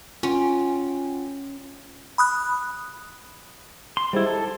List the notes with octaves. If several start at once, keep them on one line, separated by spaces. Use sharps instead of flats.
C#4 F4 F#5 G5
B5 D#6 F#6
C6
G#2 G3 E4
A4